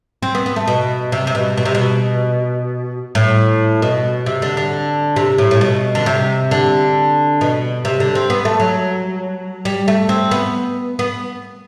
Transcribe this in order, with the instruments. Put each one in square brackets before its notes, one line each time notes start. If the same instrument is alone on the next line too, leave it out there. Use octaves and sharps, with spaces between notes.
[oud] C4
B3
B3
A3
B2
C3
C3
B2
B2
C3
B2
A2
B2
C3
D3
D3
C3
A2
A2
B2
D3
C3
D3
B2
C3
D3
C4
B3
A3
F#3
G3
A3
C4
B3
B3